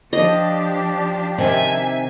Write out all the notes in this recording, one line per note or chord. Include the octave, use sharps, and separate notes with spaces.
F3 D4 G4 D#5
C3 D#3 C4 E5 G#5